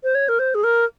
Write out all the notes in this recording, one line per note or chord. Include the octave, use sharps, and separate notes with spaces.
C5
C#5
A#4
C5
G#4
A#4